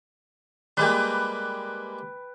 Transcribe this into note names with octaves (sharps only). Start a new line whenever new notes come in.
G3 G#3 A#3 B4 G5